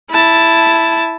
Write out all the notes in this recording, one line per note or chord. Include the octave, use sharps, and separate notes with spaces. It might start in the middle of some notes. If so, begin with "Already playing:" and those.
E4 A5